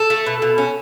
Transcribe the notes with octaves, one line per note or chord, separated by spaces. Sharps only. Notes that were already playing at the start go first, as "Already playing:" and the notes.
Already playing: A4
A3
B2
B2
C#4